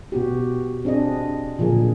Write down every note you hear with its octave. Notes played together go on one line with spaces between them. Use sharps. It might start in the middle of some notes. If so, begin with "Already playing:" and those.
B2 B3 F#4 G4
C4 D4 G#4 D#5
A#2 D3 F3 F#3 G#4 A#4